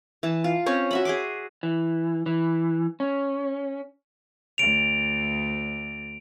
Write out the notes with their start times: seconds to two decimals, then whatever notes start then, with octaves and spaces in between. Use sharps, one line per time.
0.23 E3 A5
0.44 F4
0.66 C4 C#4 C#5
0.91 F#4 E5 B5
1.05 G#4 C6 D6
1.63 E3
2.26 E3
3.00 C#4
4.58 D2 D7 F7